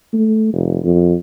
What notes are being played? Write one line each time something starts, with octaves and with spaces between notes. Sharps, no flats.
A3
F1
F2